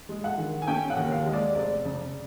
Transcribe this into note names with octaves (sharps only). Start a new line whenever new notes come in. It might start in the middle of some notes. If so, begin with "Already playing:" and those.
G#3
F#5
D#3
G#5
C#4 G5
F#5
D#2
F5
G#3
D5
F1 D5
C#3